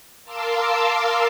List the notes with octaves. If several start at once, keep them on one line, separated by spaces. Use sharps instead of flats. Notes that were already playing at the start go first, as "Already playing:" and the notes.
A#4 F5 A5 C6 D6 E6